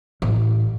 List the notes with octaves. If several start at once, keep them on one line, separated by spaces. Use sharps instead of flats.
A1